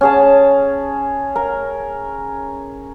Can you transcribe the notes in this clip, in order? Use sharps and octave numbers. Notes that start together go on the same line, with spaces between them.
C#4 G#4 A5
A#4